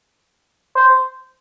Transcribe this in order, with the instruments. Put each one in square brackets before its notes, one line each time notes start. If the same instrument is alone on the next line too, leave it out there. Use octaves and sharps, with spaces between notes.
[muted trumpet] C5